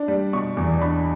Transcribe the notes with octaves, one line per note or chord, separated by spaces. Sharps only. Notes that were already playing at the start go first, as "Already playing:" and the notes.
Already playing: D4
G3
B2 C#6
E2
D4 B5